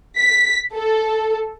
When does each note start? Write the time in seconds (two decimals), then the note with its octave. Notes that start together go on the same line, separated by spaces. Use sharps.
0.18 B6
0.73 A4